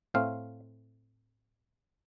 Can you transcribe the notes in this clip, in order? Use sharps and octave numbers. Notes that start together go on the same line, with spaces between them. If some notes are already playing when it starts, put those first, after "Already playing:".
A2 A3 C4 F5